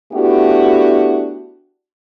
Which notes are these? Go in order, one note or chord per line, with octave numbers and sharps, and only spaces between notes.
A3 B3 D4 E4 F#4 G4